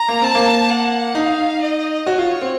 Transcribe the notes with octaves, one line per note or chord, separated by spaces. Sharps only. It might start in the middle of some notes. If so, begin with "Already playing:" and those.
Already playing: A#5
A#3
C4 A5
A#3
F#5
D#4 F5
D#5
F#4 C#5
F4
C4